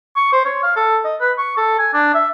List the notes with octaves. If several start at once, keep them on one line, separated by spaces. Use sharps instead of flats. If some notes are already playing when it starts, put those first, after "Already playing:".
C#6
C5
C#5
F5
A4
D#5
B4
C#6
A4
G#5
D4
E5